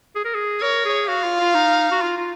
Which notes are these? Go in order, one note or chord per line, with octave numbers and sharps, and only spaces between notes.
G#4
A#4
G#4
A#4 C#5
G#4
F#4 F5
F4
F4
D#4
F#4
F4
F4